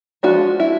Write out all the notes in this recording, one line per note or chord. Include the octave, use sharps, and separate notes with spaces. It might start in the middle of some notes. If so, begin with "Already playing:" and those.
F3 G#3 B3 D4 E4 F#4
E4